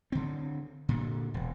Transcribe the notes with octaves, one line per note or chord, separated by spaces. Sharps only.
D3 C4
A#2 D3
E1